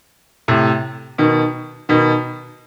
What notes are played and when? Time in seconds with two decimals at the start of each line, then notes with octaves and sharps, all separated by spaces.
0.48 A2 C3
1.18 B2 D#3
1.89 B2 D#3